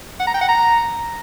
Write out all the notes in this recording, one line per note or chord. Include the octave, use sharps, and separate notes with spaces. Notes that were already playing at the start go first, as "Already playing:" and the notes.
F#5
A#5
G5
F#5
A#5